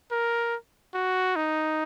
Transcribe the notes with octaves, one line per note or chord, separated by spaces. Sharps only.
A#4
F#4
D#4